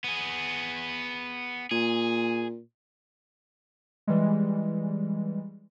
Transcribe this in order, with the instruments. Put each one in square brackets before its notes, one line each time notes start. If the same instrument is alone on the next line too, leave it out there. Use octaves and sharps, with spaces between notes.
[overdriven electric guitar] B3 G#4
[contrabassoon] A#2 [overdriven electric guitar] G#4
[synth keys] E3 G3 G#3